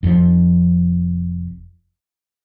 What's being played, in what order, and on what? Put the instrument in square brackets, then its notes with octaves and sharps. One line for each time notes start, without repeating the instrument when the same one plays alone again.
[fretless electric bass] F1 F2 B2 F3